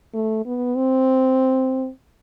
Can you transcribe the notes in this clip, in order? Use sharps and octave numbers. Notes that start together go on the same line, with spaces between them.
A3
B3
C4